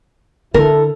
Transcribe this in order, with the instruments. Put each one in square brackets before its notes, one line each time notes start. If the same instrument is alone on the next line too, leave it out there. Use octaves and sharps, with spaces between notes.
[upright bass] D3 [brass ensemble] E4 A4 [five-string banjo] A#4